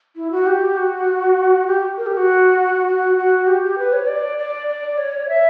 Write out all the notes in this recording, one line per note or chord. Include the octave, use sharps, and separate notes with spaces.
E4
F#4
G4
F#4
G4
A#4
G4
F#4
F#4
F#4
G4
G4
B4
C#5
D5
D5
D5
C#5
E5